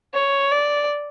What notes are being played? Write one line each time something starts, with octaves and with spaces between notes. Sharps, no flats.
C#5
D5